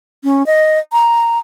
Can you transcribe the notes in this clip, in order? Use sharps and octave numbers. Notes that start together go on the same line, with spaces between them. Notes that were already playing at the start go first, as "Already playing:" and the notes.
C#4
D#5
A#5